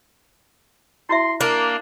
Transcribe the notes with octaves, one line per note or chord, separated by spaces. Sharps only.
E4 F#4 E5 C6
A#3 D4